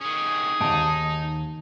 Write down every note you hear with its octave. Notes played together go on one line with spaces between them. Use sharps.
D#3 C#4 G#4
D#2 G#2 D#4 A5 D7